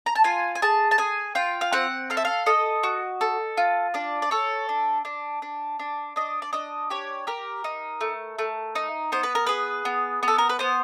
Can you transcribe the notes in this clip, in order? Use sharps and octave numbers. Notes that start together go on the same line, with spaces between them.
A#5
A5
F4 G#5
G#5
G#4 A5
A5
G#4 G#5
F4 G5
F5
C4 F#5
A4 F5
E5
F5
A4 D#5
F#4
A4
F4
D4 D5
D5
A4 C#5
D4
D4
D4
D4
D4 D#5
D5
D4 D#5
G4 C#5
G4 A#4
D#4
A3
A3
D#4
B3 C5
B4
A#4
G#4 B4
B3
B3
A4
A#4
B4
B3 C5